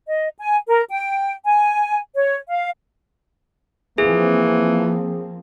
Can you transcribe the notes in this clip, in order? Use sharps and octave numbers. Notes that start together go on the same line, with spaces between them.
D#5
G#5
A#4
G5
G#5
C#5
F5
E3 F3 A#3 C4 G#4